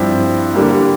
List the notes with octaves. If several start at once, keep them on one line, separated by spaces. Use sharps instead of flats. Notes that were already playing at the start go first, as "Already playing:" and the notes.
Already playing: G2 F3 C4 E4
D3 G3 A#3